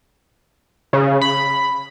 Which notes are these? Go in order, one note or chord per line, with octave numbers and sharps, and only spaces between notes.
C#3
B5